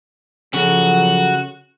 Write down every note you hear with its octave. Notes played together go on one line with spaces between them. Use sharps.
C#3 F3 F#3 F#4 A4